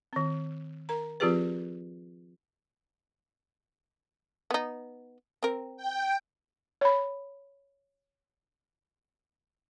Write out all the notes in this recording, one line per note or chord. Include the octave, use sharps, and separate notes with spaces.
D#3 C4
A#4 A#5
F3 C4 F4 G4 G#4 B4
B3 D#4
C4 A#4
G5
C#5 B5